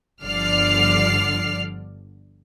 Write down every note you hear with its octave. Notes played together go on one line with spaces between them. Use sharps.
G1 D3 F3 D5 F6 C7